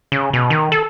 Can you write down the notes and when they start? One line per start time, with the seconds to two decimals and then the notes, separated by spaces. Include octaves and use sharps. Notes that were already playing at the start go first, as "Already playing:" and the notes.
0.12 C#3
0.33 B2
0.50 D#3
0.72 A4